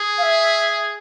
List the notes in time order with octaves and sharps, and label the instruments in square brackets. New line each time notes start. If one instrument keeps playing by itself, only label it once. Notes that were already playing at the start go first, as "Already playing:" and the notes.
Already playing: [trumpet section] G#4
[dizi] F5
E5